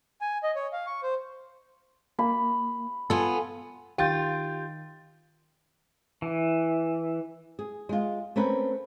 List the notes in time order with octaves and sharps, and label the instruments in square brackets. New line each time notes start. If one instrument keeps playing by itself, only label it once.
[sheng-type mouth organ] G#5
D#5
C#5
F5
C#6
C5
[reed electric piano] A#3 [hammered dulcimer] B5
[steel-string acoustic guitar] B3 F4 [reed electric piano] A4 G#5
[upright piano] D#3 [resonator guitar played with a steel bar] F4 [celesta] G4 G6 [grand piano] G5 A6
[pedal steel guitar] E3
[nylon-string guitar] G#4
G#3 F4
A3 C4 C#4 A#4 B4